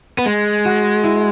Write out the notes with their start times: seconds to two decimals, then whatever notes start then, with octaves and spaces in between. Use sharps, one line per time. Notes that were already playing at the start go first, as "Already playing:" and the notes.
0.18 B3
0.26 G#3
0.65 F#4
1.04 E4